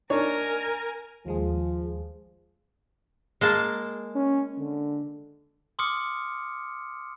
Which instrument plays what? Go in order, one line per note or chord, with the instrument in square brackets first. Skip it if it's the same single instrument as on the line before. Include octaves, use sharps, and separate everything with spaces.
[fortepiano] D4 D#4 C#5 [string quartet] A#4 G#5 A#5
[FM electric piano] D#2 G#3 G#4 [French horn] F3
[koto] G#3 A#3 A5
[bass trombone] C#4
D3
[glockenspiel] C6 D6 D#6 F6 C#7